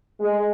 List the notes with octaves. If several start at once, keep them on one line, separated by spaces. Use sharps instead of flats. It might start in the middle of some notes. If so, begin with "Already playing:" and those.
G#3